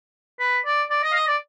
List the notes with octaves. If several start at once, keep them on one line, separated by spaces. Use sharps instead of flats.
B4
D5
D5
D#5
F5
D#5
D5